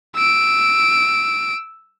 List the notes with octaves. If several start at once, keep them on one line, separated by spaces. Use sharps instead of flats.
E6 D7